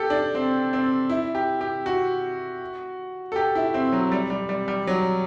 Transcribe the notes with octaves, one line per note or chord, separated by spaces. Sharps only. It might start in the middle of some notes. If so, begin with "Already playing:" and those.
Already playing: G4 A4
D4
C4
C4
E4
G4
G4
F#4
A4
G4
E4
C4
F#3
G3
G3
G3
G3
F#3